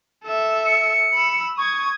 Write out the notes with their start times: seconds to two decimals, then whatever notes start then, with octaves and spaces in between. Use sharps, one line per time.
0.25 A4 E5
0.66 C#7
1.14 B5 E6
1.58 C#6 D#6 G#6